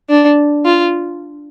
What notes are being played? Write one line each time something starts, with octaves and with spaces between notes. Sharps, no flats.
D4
F4